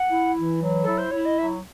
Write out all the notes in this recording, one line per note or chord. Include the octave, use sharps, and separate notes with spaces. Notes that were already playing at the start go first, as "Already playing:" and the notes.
Already playing: F#5
E4
E3
F#3
E4 A4
C5
E4 C#5
D#5
F#3 E5